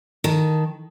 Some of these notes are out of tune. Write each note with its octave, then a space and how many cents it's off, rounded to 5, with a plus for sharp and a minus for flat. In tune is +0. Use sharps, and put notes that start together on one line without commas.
D#3 +5 A5 +0